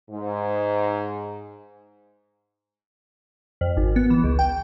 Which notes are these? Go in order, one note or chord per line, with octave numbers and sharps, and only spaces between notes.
G#2
F2
G#1
B3
E3
C#2
G5